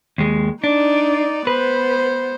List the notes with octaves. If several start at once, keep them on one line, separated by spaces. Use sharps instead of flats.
D#2 G#3
D4 D#4 D5
B3 B4 C5